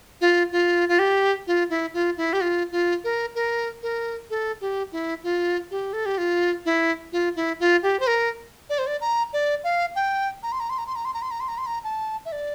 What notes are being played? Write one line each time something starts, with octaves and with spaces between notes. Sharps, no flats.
F4
F4
F4
G4
F4
E4
F4
E4
G4
F4
F4
A#4
A#4
A#4
A4
G4
E4
F4
G4
A4
G4
F4
E4
F4
E4
F4
G4
C5
A#4
D5
C5
D5
A#5
D5
F5
G5
A#5
C6
A#5
C6
A#5
C6
A#5
C6
A#5
C6
A#5
C6
A#5
C6
A#5
A5
E5
D5